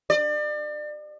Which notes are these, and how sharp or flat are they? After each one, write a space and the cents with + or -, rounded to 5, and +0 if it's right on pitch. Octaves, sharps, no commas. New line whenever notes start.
D5 +35